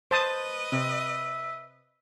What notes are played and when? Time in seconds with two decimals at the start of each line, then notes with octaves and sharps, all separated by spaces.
0.11 B4 C5 D#5 A5 D#6
0.72 C3 E5